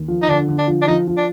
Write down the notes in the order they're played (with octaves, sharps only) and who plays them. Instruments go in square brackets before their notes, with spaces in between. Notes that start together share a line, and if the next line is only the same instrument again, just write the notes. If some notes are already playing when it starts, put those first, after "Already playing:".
Already playing: [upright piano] D#2
F3
[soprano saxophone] D#4
[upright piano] D3 [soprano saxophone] D4
[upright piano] D3
[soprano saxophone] D4
[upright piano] F3
[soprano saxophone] D4
[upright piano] F3 [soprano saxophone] D#4
[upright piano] F3
[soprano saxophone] D4